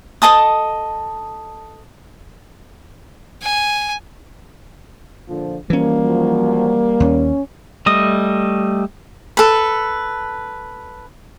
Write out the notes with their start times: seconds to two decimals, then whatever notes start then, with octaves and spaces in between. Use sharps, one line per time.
0.22 A4 D#5 A5 D#6
3.43 G#5
5.28 A#2 D3 F3
5.70 E3 F3 G3 A#3 C#4
6.04 F3 F#3
7.00 D#2 C#4
7.86 G3 A3 D#5
9.37 A4 B4